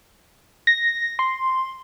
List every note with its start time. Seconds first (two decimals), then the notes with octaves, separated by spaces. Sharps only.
0.67 A#6
1.19 C6